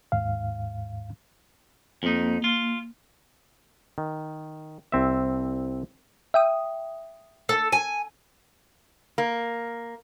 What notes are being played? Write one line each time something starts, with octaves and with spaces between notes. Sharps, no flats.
D#2 G#2 F5
F2 A#3 D#4
F4
D#3
C2 C4 E5
E5 G5 D#6
A4
G#5
A#3